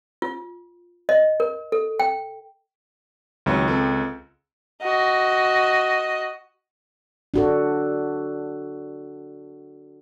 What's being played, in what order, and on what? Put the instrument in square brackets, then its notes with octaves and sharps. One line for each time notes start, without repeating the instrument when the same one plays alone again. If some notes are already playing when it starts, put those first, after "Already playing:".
[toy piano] F4
D#5
A#4
A4
G5
[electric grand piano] C#2 [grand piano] D#3 F#3 C4
[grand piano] C4 A4
[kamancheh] F#4 D#5
[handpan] D4 F#4 A4